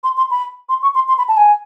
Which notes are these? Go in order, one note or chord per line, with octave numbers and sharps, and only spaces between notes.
C6
C6
B5
C6
C#6
C6
C6
B5
A5
G#5